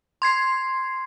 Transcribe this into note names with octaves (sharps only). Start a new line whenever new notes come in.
C6 G#6 C7